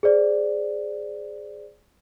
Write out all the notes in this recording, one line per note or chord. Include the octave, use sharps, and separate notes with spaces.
G#4 C5 D5